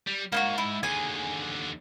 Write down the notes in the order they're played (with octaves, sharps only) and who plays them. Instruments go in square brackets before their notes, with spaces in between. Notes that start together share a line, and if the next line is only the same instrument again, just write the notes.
[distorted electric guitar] G3
[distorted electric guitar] G#2 [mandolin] A#3 D#4 F#4
[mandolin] E4
[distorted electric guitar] D#2 D3 [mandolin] G#4 G#5